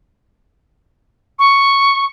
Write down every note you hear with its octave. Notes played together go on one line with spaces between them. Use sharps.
C#6